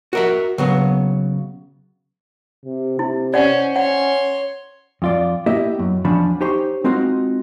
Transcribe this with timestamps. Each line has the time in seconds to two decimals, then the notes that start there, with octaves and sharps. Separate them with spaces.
0.13 F#4 A#4 E5
0.58 C#3 F#3 B3
2.65 C3
2.99 C3 E4
3.34 C#4 C5 D5 F#5
3.76 C#4 C#5 F#5 C6
5.02 F2 F4 D5
5.46 A#3 B3 E4 G4 D#5 E5
5.79 F#2
6.05 E2 F3 C#4 D4 B5
6.41 D#4 G4 C5 C#5
6.84 G#3 C4 D#4 F4 F#4